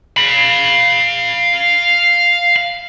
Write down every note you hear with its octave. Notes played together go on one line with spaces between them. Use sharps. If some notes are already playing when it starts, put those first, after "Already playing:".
F5 B5